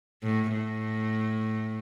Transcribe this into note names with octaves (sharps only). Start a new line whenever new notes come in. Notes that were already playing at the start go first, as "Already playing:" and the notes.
A2
A2